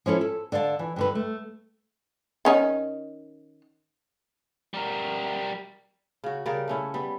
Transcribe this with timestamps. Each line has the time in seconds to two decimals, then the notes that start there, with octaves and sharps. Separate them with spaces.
0.06 F3 C#4 E4 A4
0.21 A4
0.52 D3 D5 F5 A5
0.79 E3
0.96 G2 D3 B4
1.15 A3
2.45 D#3 C#4 D#4
4.74 G3 A#4
6.24 C#3 F#4
6.46 C#3 G3 A#4 D5
6.68 A3 C#4 E4
6.94 G3 B3